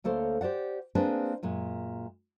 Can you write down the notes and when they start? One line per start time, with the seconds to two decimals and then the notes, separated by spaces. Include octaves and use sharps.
0.04 D2 A#3 A4 C5 C#5
0.41 G4 C5 D5 F#5
0.95 A#3 C4 D4 G#4 B4 C5
1.43 F#2 A#2 G#3